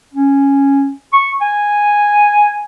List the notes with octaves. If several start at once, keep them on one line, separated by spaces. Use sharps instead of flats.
C#4
C#6
G#5